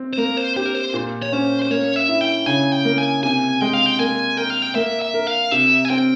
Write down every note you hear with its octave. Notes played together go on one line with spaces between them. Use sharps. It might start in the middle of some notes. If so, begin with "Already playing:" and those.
Already playing: C4
C5
A#3 A#4
C5
G4 C5
A#4
C5
A#2
C#5
C#4 C5
C5
A#3 C#5
E5
E4
G5
C#3 G#5
G5
A#3
G#5
C3 G#5
G#3 G5
F5
G5
A#3 G#5
A#4 G5
F5
G5
A#3 E5
E5
A#4
F5
C3 E5
G#5
C4 G5